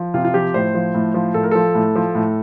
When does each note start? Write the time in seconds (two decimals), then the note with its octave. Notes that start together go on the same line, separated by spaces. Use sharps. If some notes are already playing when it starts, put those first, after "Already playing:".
Already playing: F3
0.14 C3 F4
0.24 F4
0.34 F3 G4
0.54 A2 C5
0.74 F3
0.95 A2
1.14 F3
1.34 A2 A4
1.43 A#4
1.51 F3 A4
1.75 A2
1.96 F3
2.15 A2